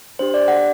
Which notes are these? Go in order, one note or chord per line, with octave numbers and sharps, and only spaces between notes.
D4 G4 C5
D5
F#5